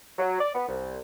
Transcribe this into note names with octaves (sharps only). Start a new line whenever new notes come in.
F#3
D5
B3
C2